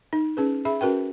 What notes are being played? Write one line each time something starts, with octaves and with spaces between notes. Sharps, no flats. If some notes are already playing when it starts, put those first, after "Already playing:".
D#4
C#4 G#4 B4
G#4 E5 B5
C#4 F#4 A#4 B4 G5